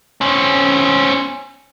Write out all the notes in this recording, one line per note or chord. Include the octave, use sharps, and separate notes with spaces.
C4 C#4